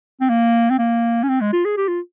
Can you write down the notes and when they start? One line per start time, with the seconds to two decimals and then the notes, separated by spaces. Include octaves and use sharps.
0.21 C4
0.29 A#3
0.70 C4
0.78 A#3
1.23 C#4
1.29 C4
1.41 G#3
1.53 F4
1.65 G#4
1.77 G4
1.88 F4